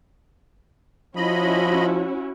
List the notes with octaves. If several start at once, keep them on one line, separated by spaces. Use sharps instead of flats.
F3 C#4 E4 F#4 D#5 B5